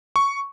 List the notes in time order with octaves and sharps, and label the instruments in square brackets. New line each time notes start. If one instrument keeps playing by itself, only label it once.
[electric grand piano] C#6